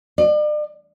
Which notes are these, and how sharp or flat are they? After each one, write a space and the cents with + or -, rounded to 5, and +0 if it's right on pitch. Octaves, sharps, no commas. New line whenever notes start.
D5 +40